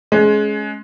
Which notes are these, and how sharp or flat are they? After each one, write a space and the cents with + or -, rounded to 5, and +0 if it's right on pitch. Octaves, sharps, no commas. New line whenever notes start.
G#3 +20 C#4 +0